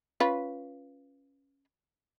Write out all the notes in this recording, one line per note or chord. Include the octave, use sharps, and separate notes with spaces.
C#4 F4 B4